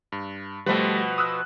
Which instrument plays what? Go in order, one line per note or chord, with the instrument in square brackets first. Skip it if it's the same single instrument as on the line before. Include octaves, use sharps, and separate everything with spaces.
[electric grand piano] G2
[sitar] B2 F3 B4 [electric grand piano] G3 A3
[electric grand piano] D#6 E6 F#6